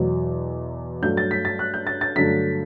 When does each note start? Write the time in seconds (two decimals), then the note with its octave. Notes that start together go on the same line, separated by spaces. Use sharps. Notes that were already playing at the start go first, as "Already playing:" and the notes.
Already playing: E2 B2 F#3
1.02 G2 F#3 A3 G6
1.17 A6
1.31 B6
1.45 A6
1.59 F#6
1.74 G6
1.87 A6
2.01 A6
2.16 G2 D3 F#3 A3 B6